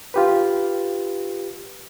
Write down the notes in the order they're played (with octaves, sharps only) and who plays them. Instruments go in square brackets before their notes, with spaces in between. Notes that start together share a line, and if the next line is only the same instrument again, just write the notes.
[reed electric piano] F4 G4 B4